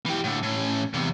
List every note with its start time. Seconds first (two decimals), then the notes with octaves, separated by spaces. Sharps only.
0.06 E3 G4
0.24 A2 D3
0.43 A2 C#4
0.94 E2 C3